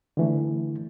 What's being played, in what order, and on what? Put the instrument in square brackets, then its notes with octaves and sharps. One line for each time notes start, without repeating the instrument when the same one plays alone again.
[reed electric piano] D3 E3 A3